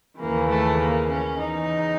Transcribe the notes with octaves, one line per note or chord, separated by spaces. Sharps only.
D#2 C#3 E3 A#3
A3
A#3
C#4
E2 C#3 E3 D#4